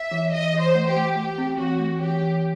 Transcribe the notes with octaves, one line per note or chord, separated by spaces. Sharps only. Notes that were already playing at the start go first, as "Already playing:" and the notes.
Already playing: E5
E3
E3 D#5
E3
C5
A3
G4
A3
A3 G4
C4
E3 F#4
A3
E3 G4
E3